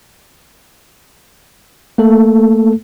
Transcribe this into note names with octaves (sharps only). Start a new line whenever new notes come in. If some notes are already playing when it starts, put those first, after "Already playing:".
A3 A#3 A4